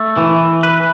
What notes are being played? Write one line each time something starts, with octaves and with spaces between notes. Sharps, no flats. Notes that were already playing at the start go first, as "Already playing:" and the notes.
Already playing: A3
E3
B4